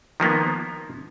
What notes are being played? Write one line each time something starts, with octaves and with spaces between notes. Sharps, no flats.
D#3 F3 A#3 B3